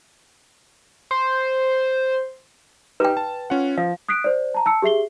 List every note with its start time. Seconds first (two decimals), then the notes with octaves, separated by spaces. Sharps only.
1.11 C5
3.00 D#4 G4 B4 G5
3.17 A5
3.50 C#4 F4 F#5
3.78 F3 F5
4.09 D#6 F#6 B6 C7 D7
4.24 C5 D5
4.54 A5 A#5
4.66 A5 E6 C#7
4.82 G4 G#4 E5 C7 G7